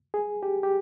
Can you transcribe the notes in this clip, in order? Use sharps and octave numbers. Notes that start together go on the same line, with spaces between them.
G#4
G4
G4